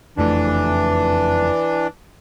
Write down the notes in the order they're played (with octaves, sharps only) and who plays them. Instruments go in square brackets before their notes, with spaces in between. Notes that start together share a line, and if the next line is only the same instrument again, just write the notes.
[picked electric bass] F#1 F2 A3 [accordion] E3 D4